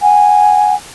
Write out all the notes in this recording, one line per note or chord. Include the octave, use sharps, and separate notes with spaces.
F#5 G#5